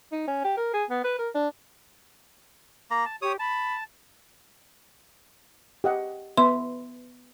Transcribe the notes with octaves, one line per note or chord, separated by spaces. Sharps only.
D#4
C#4
G4
A#4
G#4
B3
B4
A#4
D4
A#3 A#5
A5
G4 C#5 D#6
A5 B5
G4 D#5 F#5
B3 B4 E5 C6